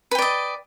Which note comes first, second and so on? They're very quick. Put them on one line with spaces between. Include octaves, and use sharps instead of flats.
B4 G5 D5 D#5